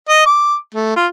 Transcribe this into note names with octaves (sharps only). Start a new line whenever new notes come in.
D#5
D6
A3
F4